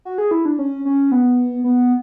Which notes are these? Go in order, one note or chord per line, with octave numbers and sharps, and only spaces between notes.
F#4
G#4
E4
D4
C#4
C#4
B3
B3